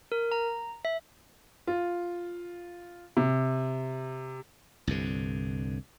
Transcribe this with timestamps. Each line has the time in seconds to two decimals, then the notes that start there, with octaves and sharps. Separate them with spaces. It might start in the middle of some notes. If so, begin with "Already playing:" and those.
0.12 A#4
0.32 A#5
0.85 E5
1.67 F4
3.17 C3
4.87 C2 G2 D3